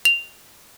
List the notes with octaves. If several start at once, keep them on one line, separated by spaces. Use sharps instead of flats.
F7